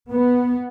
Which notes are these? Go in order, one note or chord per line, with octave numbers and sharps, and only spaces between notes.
B3